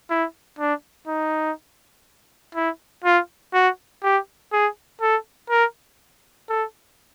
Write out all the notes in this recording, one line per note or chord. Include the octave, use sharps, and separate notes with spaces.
E4
D4
D#4
E4
F4
F#4
G4
G#4
A4
A#4
A4